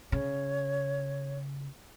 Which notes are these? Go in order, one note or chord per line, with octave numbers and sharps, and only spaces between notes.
C#3 C#5